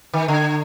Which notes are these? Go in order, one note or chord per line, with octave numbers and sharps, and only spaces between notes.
D#3
D3